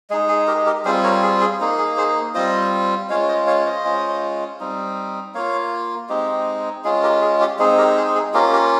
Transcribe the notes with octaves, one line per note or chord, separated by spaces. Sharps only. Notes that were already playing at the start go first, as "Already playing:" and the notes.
G#3 D#4 G#4
G#4
G4 A#4
G4 A#4
G3 C4 F4 G#4 C5
A#4 C#5
G#4
G#4
A#3 D#4
G#4
G#4 C5
G3 C4 F4 C5 D#5
G#3 C#4 F4 C#5 F5
C5 D#5
C#5 F5
C5 D#5
G#3 C#4 F4
G3 C4 D#4
A#3 F4 C#5 F5
G#3 C4 D#4 G4
G#3 C#4 F4 G#4
G4 A#4
G#4
G4
G#3 C4 D#4 G#4
G4 A#4
G#4
G#4
A#3 C#4 F4 G4 A#4
G4 A#4